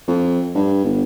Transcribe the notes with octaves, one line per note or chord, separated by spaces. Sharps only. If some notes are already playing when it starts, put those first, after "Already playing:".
F2
G2
G1